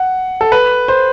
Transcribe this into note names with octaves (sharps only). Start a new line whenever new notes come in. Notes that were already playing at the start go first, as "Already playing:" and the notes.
Already playing: F#5
A4
B4
C5